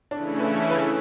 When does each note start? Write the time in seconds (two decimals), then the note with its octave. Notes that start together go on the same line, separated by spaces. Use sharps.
0.11 C#3 E3 A3 C#4 D4 E4
0.40 B4
0.70 B4